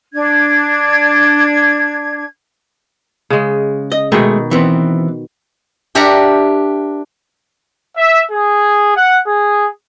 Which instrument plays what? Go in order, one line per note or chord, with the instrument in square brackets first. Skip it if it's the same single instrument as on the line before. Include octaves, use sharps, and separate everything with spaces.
[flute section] D4 G#6
[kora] C#3 G#3
[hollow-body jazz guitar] D#5
[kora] B2 D#3 [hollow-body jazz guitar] G#3 A3 G#4
[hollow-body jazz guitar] E3 B3 C4
[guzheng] D4 G4 A#4 E5 F#5 A#5
[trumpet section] E5
G#4
F#5
G#4